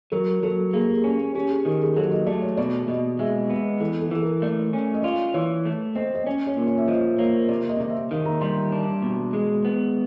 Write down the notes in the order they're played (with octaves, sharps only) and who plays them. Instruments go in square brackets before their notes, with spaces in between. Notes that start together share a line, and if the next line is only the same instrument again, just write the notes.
[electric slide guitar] F#3 [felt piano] A#4
[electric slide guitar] F#3 [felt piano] A4
[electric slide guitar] A#3 [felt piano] G#4
[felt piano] G4
G#4
[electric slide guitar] C#4
[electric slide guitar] C#4 [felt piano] G4
[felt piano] G#4
[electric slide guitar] D#3 [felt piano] G4
[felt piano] G#4
[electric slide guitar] F#3 [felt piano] A4
[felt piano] D#5
[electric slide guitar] A3 [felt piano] D5
[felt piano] C#5
[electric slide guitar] B2 [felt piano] D5
[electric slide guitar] B2 [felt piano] D#5
[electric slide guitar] G#3 [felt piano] E5
[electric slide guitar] B3 [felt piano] D#5
[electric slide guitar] E3 [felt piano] A4
[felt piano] A4
[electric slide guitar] E3 [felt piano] A4
[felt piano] A#4
[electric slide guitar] A3 [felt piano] D5
[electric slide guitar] C#4
[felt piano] D#5
[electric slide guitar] F4 [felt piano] D5
[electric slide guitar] E3 [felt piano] C#5
[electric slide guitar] A3
[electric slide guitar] C4 [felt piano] D#5
[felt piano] D#5
[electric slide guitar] C#4 [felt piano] D5
[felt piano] C#5
[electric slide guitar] A#2
[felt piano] C#5
E5
[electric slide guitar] F3 [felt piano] D#5
[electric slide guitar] A#3 [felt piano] C#5
[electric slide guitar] C3 [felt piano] D5
[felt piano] D#5
[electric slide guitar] C3 [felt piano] D#5
[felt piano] E5
[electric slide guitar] D#3 [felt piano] F5
[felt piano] A#5
[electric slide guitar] G3 [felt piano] C6
[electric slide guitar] D4
B2
G#3
B3